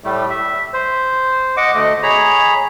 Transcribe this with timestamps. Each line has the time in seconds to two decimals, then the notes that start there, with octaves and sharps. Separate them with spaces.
0.04 A2 G3 A3
0.30 E5
0.73 C5
1.57 D#5 F#5 D6
1.75 D2 A3 D#5
2.03 G#4 C#5 A#5 B5